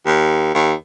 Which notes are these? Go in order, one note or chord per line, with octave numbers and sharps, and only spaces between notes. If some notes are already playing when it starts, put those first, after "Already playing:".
D#2
D#2